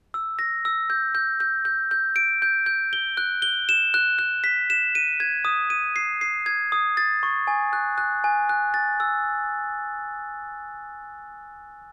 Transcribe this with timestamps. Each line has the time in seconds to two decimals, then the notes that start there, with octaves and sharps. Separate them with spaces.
0.14 E6
0.39 A#6
0.65 E6
0.90 G6
1.15 G6
1.40 G6
1.65 G6
1.91 G6
2.16 D7
2.42 G6
2.66 G6
2.93 G7
3.17 F#6
3.42 G7
3.69 E7
3.94 F#6
4.19 F#6
4.44 B6
4.70 E7
4.95 D#7
5.20 G#6
5.45 D#6
5.70 D#7
5.96 C7
6.21 C7
6.46 G#6
6.72 D#6
6.97 A6
7.23 C#6
7.47 G#5
7.73 F#6
7.98 F#6
8.24 G#5
8.49 F#6
8.74 A6
9.00 E6